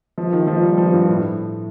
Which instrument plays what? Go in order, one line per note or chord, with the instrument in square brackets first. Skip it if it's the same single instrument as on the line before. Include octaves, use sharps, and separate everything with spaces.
[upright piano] F3
D#3
F3
G3
F3
G2
A2